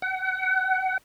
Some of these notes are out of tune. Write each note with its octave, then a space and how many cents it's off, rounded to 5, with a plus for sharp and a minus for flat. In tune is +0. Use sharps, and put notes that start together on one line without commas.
F#5 +30